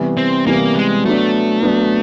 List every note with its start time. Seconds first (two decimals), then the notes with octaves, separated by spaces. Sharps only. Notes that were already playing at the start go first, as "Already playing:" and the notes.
Already playing: C3 E3 G3 B3
0.17 C4
0.46 C3 E3 G3 A#3 B3
0.76 G#3
1.05 F#3 A3 B3 D4
1.63 F#3 B3 D4